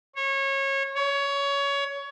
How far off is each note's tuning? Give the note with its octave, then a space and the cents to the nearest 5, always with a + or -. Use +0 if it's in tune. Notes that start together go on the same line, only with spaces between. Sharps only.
C#5 -25
C#5 +20